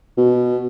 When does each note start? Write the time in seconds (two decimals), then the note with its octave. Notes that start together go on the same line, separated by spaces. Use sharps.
0.17 B2